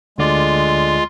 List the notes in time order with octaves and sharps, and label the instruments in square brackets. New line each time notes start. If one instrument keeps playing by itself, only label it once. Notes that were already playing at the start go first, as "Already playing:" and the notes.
[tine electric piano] D2 D3 D5 [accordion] G#3 [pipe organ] F4